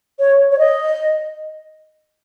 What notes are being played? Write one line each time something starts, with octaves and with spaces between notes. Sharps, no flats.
C#5
C#5
D#5